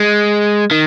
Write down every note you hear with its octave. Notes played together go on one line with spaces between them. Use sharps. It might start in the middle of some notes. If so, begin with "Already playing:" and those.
Already playing: G#3
D#3